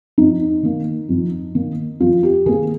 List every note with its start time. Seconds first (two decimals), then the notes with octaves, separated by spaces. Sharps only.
0.18 F2 D#4
0.63 D#3 A#3
1.09 F2
1.55 D#3 A#3
2.00 F2 F4
2.23 G4
2.46 D#3 A#3 G#4